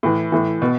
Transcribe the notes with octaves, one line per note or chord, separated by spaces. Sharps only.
A2 E3
A2 E3
B2